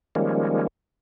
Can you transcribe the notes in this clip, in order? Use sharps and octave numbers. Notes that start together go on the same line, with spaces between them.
D#3 F3 G3 G#3 A#3 C#4